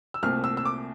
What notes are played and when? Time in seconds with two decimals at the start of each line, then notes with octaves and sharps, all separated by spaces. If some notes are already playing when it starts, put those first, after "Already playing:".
0.14 E6
0.23 C2 A#2 A3 C4 F6
0.44 E6
0.57 E6
0.65 D6